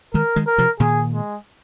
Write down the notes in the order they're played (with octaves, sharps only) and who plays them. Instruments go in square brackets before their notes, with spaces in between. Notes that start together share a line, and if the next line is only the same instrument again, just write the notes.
[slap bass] D#3 G#3 [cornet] A#4
[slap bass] D#3 G#3
[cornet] A#4
[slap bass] C3 F3
[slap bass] A#2 D#3 [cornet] G#4
[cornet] G#3